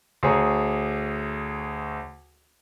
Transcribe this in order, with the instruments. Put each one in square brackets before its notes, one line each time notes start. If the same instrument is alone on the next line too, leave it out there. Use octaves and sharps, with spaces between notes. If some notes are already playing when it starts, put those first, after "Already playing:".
[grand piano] D2 G#4 C#5 A#5